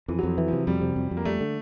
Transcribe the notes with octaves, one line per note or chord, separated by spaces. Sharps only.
F2 E3
F#3
F2 F3
E3
C3 F3
F2 G3
C3
F2
F2
A#3
G3 A3
D3